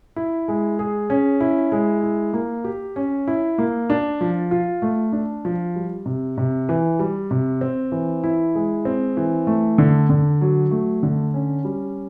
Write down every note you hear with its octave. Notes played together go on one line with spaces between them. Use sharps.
E4
G#3
G#4
C#4
E4
G#3
E4
A#3
G4
C#4
E4
A#3
D4
F3
F4
A3
D4
F3
G3
C3
C3
E3
G3
C3
C4
E3
E4
G#3
C4
E3
A3
D3
D3
F#3
A3
D3
C#4
G3